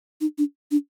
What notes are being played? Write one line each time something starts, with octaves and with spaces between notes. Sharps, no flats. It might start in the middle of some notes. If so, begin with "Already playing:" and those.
D#4
D4
D4